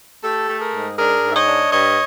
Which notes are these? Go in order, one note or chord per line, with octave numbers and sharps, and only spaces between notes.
A3 G4 A4
A3
G#4 A#4
G#2
D4 G#4 A#4
G#2
E5
C#5 D#5
D4
G2 C#5 D#5